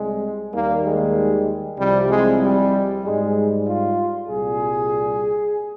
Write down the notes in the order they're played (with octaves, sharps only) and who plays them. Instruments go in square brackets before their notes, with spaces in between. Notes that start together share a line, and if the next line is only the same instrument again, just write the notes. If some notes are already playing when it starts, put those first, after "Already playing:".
Already playing: [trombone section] C2 C3 G3 G#3
D#2 D#3 G3 A#3
G#3
C2 C3 F3 G3
G#3
G3
G#2 G3 G#3
F4
C2 A#2 G3 G#4